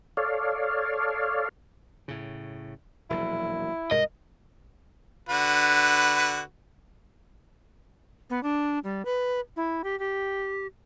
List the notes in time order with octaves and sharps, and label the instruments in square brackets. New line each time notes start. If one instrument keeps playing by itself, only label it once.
[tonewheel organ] A4 C#5 D5 F5
[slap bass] A2 C#3
[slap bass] E1 A#1 F#3 [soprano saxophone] E4
[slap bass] C2 G#2 B2 [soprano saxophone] A#4 [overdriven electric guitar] D#5
[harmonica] D3 F#4 B4
[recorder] B3
D4
G3
B4
E4
G4
G4